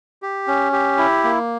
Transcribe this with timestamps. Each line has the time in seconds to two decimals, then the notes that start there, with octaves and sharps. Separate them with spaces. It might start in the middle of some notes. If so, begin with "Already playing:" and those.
0.22 G4
0.47 C#4
0.72 G4
0.98 E4
1.24 A#3